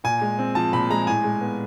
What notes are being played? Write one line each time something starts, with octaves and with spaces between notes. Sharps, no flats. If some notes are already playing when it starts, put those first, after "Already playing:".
A#2 G#5
G#3
C4
F3 A5
A#2 B5
G#3 A#5
A2 G#5
G#3
B3